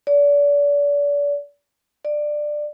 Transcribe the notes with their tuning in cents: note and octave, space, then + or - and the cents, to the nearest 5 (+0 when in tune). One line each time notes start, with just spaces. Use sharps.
D5 -35
D5 +15